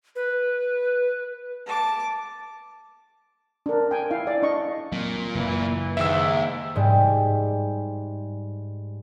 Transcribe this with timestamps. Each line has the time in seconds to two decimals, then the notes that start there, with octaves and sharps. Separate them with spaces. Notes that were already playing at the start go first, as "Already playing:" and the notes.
0.16 B4
1.66 A5 D6
3.66 D4 A#4
3.91 G5 G#5
4.11 E4 F5
4.27 D5
4.42 D4 D#5 C#6
4.92 A#2 F#3 C4
5.35 F#2 C#3 E3 F#3
5.97 D#2 G#2 E5 E6
6.76 G#2 G3